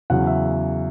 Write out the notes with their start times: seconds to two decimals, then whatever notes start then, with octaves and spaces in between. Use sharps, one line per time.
0.10 E2 C#3 F#3 C#4 F#5
0.27 E5